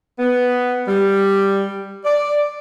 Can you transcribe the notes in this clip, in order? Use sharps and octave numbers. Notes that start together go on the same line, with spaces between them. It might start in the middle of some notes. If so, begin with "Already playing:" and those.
B3
G3
D5